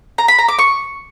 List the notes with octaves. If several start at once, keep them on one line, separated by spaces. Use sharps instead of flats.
A#5
B5
A#5
D6
C#6